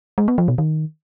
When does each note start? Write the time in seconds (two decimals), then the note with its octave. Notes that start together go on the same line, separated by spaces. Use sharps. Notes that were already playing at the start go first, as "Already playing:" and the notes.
0.18 G#3
0.28 B3
0.38 F3
0.48 B2
0.58 D#3